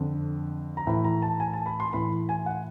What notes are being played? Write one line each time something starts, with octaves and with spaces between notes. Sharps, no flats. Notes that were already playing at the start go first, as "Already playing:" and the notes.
Already playing: F2 D3
A#5
A2 E3 B5
A#5
A5
G#5
A5
B5
C6
A2 E3 B5
G#5
F#5